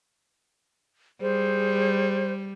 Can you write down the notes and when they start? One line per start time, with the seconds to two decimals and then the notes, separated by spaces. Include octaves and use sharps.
1.21 G3 G#4 C5